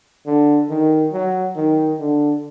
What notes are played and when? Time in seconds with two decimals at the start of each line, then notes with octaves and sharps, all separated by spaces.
0.26 D3
0.70 D#3
1.13 F#3
1.56 D#3
2.00 D3